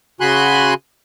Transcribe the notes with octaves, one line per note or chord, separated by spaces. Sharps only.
C#3 F#4 G#5 B5 C6 F#6